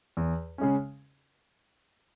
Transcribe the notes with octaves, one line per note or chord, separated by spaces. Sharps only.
E2
C#3 G#3 C#4